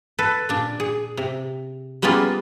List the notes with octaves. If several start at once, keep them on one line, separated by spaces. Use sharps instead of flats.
A4 B4
A#2 D4
G#4
C3
G3 A#3 B3 C#4 F4 G#4